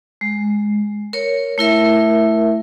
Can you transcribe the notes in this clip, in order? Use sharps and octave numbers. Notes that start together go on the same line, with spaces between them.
G#3
A#4 C#5
A3 E4 A#4 E5